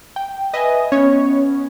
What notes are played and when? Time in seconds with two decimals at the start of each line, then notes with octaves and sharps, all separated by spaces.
0.16 G5
0.54 B4 D#5 E5 G#5
0.92 B3 C#4 C#5